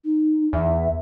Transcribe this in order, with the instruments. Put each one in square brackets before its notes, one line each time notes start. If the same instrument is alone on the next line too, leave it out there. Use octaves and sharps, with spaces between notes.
[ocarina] D#4
[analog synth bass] E2 [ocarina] E5